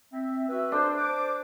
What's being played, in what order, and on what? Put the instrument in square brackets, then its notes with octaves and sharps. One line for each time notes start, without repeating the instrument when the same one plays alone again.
[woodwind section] C4 E5
F#4 B4 E5
[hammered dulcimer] D4 [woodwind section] A4 C5
[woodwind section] C5 D6